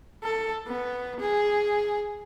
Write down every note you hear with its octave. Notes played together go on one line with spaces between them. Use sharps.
A4
B3
G#4